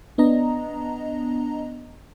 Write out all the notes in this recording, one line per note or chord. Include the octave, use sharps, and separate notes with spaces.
B3 D4 D#5 A#5